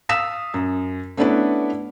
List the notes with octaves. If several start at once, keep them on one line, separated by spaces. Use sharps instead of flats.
F5 D#6 E6 B6 E7
F#2
A3 B3 C#4 D4 E4 B4